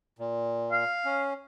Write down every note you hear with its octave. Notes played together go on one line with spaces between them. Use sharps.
A#2
F5
C#4